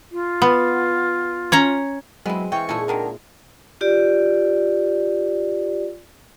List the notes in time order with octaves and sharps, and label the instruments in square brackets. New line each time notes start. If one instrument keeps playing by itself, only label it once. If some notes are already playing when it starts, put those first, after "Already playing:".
[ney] F4
[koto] B3
C#4 C#5 A#5
[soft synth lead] F#3 [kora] G#3 C4 [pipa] B3 E4 [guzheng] B4
[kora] E3 F5 [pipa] G5 [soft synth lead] C#6
[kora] A#2 E4 [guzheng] G#3 D#4 [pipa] A4 G#5
[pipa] B2 D3 D#3 [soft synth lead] A#4
[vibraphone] F4 G4 D5